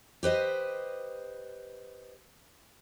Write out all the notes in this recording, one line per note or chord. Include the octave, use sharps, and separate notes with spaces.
G4 B4 C5 D#5